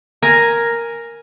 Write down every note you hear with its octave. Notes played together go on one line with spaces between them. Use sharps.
A#4 G#5